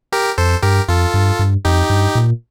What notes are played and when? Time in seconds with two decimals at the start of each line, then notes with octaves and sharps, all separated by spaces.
0.12 G4 A#4
0.38 F2 A4 C5
0.63 G2 G4 A#4
0.88 F2 F4 A4
1.14 G2
1.39 G2
1.65 F2 D#4 G4
1.90 G2
2.15 A#2